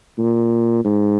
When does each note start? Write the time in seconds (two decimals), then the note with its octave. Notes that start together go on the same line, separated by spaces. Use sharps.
0.18 A#2
0.84 G#2